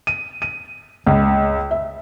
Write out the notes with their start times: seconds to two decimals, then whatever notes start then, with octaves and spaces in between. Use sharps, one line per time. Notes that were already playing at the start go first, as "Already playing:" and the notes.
0.07 D#7
0.42 D#7
1.07 C#2
1.71 E5